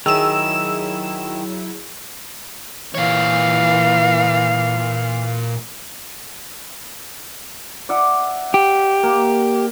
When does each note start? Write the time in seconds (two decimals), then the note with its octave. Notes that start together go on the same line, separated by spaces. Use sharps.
0.06 D#3 F#3 E4 G#4 E6 E7
2.95 A#2 E3 C#5 F5
7.89 D5 E5 F#5
8.54 G4
9.03 A#3